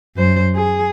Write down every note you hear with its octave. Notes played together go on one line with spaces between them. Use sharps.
F#2 C5
G#4